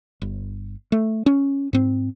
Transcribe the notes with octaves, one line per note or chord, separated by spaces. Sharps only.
G1
A3
C#4
G#2 C4